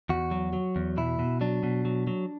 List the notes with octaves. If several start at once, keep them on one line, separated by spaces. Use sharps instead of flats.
E2 F#4
F#3
F#3
E2
B2 E4
B2
F#3 D4
B2
F#3
F#3